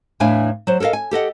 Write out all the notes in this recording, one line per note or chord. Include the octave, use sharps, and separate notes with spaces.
E2 A2 E3 D4 F5 G#5
F#3 C5
A4 A#4 C#5 D#5 F5
G#5
G4 A4 D#5 F#5